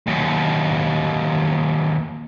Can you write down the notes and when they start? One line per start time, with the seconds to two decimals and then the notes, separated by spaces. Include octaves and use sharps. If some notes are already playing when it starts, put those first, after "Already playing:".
0.07 D#2 F#3